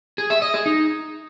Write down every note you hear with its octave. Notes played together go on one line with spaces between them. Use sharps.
G#4
E5
D#5
G#4
D#4